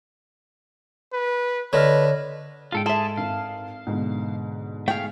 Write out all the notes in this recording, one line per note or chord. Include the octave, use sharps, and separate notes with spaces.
B4
D3 B4 C#5 D#5 F6
G#2 G#3 F4 A4 G5
G#4 A4 E5 A5 C6
G#1 F5
G#2 B2 D3
A3 G#4 F5 G5